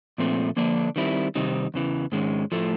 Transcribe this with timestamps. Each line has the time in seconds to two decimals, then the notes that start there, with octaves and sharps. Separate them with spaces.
0.18 A#2 F3 A3 C4
0.56 D3 F3 A#3 D4
0.96 D#3 G3 C4 E4
1.35 C3 D#3 G3 C4 D#4
1.74 E2 C#3 E3
2.12 G#2 D#3 G#3 C#4
2.52 A2 F3 A3